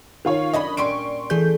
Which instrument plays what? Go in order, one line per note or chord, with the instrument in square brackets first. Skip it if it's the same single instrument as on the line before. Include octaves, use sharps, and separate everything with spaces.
[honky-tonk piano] D#3 F4 C#5
[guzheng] F#2 D4 C#5 [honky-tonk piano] D#5 B5
[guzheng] A#2 G3 C#4 [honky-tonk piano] C6 C#6 D7
[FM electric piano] E3 G#4 G6 [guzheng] A3